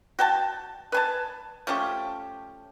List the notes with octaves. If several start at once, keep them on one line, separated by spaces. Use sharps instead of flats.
F#4 G5 A5
B4 G#5 A5
F3 A3 C#4 G4